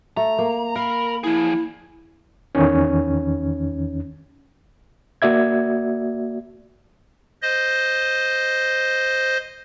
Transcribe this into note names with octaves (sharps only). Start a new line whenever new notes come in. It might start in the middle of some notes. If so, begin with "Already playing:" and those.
A3 A#5
A#3
A#4 F5 B5
F3 E4 G#4
E2 D#3 C#4
A#3 F#4 D5 E5 G#6
C5 D#5